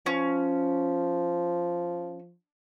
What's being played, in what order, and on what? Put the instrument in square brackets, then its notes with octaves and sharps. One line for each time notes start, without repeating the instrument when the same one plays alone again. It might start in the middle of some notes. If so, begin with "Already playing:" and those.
[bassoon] F3 [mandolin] C#4